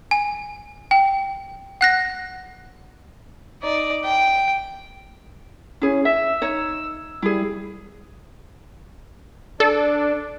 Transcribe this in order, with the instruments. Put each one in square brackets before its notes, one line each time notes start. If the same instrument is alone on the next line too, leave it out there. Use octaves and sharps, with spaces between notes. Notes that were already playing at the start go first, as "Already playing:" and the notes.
[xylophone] G#5
G5
F#5 F#6 A#6
[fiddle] D#4 D5
G5
[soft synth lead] C#4 [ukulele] E4 G#4
[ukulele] E5 [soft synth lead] E6
[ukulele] D#4 C#5
[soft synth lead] G3 [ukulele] E4 G#4
[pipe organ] D4 [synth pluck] A4 [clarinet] D5